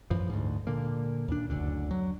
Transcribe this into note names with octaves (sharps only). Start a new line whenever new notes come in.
A1 F#2 E3 F3
D2 G#2
A#2 D3 A#3
D#2 A#2 D4
F#1 D2 D3 D4
F#3